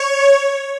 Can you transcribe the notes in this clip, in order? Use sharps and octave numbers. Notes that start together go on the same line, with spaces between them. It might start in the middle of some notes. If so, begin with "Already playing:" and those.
Already playing: C#5